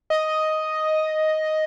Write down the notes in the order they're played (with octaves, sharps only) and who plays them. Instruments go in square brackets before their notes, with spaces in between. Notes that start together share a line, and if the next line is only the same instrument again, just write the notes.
[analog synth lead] D#5